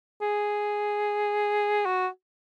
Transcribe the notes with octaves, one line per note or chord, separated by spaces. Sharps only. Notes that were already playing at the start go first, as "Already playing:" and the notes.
G#4
F#4